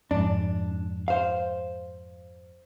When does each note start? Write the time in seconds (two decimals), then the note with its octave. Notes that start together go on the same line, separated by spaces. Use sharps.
0.11 F2 G#2 D4
1.08 C5 F5